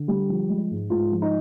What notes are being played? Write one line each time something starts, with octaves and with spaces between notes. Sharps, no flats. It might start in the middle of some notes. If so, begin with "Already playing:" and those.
Already playing: D3
G3
F3
G#3
G#2
G#2 F4
F3
D#4